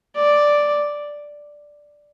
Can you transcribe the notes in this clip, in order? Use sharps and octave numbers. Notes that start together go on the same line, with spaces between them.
D5